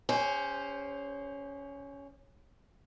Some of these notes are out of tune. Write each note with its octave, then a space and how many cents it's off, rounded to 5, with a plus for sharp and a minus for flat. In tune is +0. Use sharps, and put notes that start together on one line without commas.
C#4 +15 G#4 -45 C5 +0